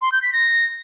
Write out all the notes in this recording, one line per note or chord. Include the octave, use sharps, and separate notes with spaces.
C6
G6
B6
A#6